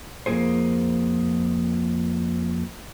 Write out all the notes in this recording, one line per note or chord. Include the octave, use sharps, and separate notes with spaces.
F2 D#3 A#3 G#4 C5